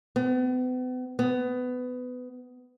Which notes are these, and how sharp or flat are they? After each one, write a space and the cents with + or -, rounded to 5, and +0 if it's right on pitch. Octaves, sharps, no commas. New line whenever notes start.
B3 +40
B3 +20